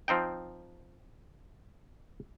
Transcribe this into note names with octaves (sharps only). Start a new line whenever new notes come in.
F3 C4 D#4 G5